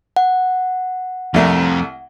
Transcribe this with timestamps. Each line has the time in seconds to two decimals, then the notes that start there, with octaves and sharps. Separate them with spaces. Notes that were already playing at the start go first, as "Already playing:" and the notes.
0.17 F#5
1.34 C2 F2 A3 A#4